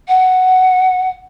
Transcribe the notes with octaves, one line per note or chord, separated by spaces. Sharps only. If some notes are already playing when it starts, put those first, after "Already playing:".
F#5